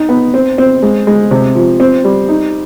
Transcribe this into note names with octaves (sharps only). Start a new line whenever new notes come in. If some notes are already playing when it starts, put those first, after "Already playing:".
Already playing: D#4
B3
C4
C4
G#3
G#3
C3
F3
C4
G3
D#4